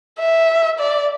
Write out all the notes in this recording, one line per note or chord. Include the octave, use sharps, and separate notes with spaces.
E5
D5